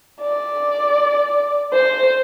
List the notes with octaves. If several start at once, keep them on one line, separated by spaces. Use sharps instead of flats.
D5
C5